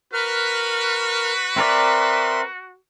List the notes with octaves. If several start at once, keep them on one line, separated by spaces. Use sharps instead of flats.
F#4 A#4 B4 F6
C4 A#4 D5 E5 C6